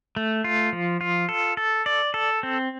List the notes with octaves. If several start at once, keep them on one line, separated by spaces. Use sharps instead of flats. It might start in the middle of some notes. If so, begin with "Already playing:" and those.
A3
F4
F3
F4
A4
A4
D5
A4
C4